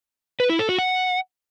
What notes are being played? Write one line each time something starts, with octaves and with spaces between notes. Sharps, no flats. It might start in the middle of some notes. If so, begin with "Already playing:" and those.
B4
E4
A4
F#4
F#5